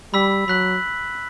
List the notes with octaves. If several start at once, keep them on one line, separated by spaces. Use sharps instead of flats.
G3 B5 E6 B6
F#3 B5 F#6 B6 F#7